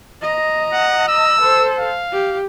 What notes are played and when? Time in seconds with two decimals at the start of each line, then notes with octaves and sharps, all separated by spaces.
0.22 D#5 A#5
0.73 F#5
1.08 E6
1.41 A4 C5
1.79 F5
2.12 G4